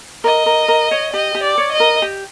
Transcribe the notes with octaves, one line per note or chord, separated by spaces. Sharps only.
A#4 D#5
A#4
A#4
C#5
G4 D#5
G4
D5
C#5
D#5
A#4
G4